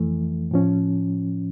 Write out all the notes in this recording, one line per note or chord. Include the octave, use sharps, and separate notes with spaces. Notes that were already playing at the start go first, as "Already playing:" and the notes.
Already playing: F2 E3 A3
A2 F3 C#4